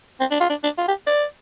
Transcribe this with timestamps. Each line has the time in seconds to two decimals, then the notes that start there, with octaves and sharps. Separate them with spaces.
0.20 C4
0.31 D4
0.40 F4
0.50 D4
0.64 D4
0.78 F4
0.88 G4
1.07 D5